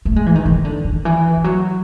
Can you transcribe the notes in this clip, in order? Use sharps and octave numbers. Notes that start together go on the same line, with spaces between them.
A3
G#3
E3
D#3
D#3
D3
D#3
E3
F3
F#3